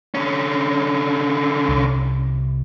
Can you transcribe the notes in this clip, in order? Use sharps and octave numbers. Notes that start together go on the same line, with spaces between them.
D3 C#4
C2